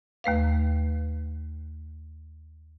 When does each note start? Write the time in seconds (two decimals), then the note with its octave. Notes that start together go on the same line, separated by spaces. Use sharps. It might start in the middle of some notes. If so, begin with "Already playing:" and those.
0.24 D#2 A3 B4 F5